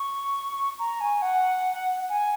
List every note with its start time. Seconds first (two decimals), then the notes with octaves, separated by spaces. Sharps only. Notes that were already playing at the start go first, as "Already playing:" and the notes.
Already playing: C#6
0.79 A#5
1.01 G#5
1.22 F#5
2.09 G#5